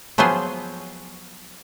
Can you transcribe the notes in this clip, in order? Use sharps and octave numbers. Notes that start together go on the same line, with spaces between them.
F3 F#3 B3 G#4 C5